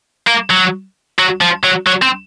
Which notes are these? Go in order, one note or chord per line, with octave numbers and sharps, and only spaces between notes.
A#3
F#3
F#3
F3
F#3
F#3
C4